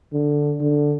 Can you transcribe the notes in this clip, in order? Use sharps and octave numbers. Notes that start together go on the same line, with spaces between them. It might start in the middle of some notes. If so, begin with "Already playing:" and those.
D3
D3